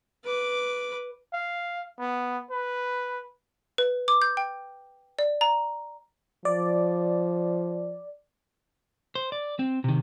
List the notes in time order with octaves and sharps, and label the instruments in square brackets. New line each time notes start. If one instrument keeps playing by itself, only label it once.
[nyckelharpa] B4 D6
[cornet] F5
B3
B4
[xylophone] B4
D6
G6
G5
D5
A#5
[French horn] F3 [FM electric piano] D5
[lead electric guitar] C5
D5
C4
C3 D#3